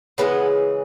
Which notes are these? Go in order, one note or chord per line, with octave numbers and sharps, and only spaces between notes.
C#3 E3 G#3 B3